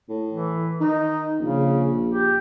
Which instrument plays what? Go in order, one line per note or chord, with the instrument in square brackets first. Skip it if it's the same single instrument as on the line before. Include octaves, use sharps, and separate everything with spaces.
[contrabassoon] A2
[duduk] E3
[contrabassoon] D#3 [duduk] D#4
[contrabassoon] A#1 [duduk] C#3
[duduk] G4